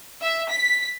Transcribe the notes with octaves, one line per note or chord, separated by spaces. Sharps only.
E5
B6